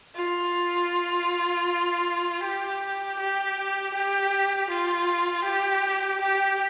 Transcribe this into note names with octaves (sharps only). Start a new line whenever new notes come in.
F4
G4
G4
G4
F4
G4
G4